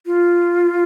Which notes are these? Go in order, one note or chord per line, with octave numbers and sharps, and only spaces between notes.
F4